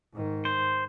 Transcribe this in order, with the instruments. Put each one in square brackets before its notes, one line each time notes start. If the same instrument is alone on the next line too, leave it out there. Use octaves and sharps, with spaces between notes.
[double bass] G#2 D#3
[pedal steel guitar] C5